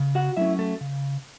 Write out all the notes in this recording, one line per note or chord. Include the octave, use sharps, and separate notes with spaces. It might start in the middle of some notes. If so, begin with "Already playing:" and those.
Already playing: C#3
F#4 F#5
F#3 A3 C#4 E4 E5
A3 A4
C#3